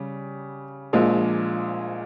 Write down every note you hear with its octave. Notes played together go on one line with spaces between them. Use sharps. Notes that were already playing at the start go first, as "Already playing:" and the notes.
Already playing: C#3 G3
A#1 A#2 F3 G#3